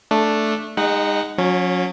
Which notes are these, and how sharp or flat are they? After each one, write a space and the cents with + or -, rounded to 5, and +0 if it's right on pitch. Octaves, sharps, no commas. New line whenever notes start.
A3 +0 D4 +0
G#3 -35 D#4 +0 F#5 +5
F#3 -40 C#4 +0